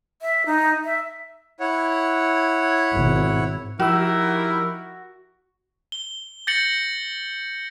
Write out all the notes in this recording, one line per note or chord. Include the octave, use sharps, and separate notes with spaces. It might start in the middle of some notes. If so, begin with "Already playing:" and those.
E5
D#4
E5
E4 C#5 F#5
G#1 B2
F3 D#4 E4 F#4 G4 A#4 E6
G7
G6 A6 A#6 C#7 F#7 G7